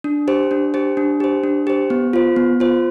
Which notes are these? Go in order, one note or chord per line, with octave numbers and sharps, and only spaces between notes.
D4
G4 C5
D4
G4 C5
D4
G4 C5
D4
G4 C5
B3
F4 C5
B3
F4 C5